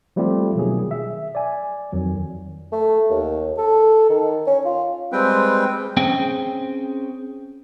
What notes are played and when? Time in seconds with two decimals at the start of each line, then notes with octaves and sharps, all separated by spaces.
0.16 F3 G3 A3 C4 F4 G4
0.55 B2 D#3 F#3 G#4
0.91 E5
1.35 D5 G#5
1.93 F2 D#3 F#3
2.72 A3
3.10 D#2
3.58 A4
4.10 D#3
4.47 C#4
4.65 F4
5.12 G3 G#3 C4 B4 G5
5.97 C4 C#4 G#4 C5 G5